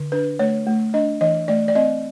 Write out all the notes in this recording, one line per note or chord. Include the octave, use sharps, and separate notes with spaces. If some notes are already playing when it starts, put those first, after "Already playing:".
Already playing: D3
D4 B4
A3 C#5
A3
D4 D#5
E3 D#5
A3 D5
D5
C4 D#5